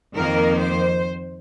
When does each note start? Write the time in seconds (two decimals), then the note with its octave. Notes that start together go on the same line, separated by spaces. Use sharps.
0.14 F2 D#3 A#3 A#4
0.57 C5